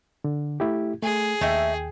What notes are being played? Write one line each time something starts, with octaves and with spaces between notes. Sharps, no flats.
D3
A3 E4 G4
A3 G#4
D#2 A3 D#5 E5 G5